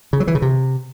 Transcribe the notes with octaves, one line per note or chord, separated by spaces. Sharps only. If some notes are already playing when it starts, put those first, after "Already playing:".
C#3
F#3
E3
C#3
C3